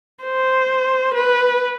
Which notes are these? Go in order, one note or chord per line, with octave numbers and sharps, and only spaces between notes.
C5
B4